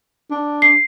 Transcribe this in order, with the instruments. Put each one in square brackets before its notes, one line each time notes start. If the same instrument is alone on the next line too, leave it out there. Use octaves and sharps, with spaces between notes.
[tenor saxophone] D4
[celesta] C7